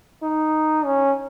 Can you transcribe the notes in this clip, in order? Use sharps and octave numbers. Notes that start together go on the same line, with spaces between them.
D#4
C#4